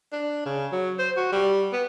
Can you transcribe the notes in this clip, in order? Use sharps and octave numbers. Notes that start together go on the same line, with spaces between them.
D4
C#3
F#3
C5
F#4
G3
B3